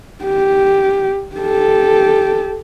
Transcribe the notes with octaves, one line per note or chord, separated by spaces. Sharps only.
G4
G4 A4